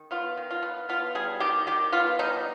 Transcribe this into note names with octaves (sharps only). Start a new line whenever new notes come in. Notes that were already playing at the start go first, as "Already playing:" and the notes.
Already playing: D#3
B3 F4
D#3
F4
B3
B3 F4
G3 G#4
D#3 G4
D#3 G4
B3 F4
G3 D#4